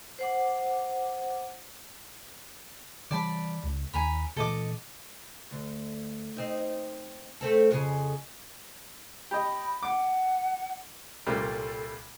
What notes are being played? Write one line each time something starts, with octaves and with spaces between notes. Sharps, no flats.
C5 F#5 D6
E3 G3 D5 A5 B5
C#2
D#2 G#5 A#5 B5
A#2 E3 A4 D#5 D6
D2
C4 D#4
A3 C4 A4
F2 C#3 G#4
G4 D#5 B5
F#5 D6
C2 A#2 G3 A4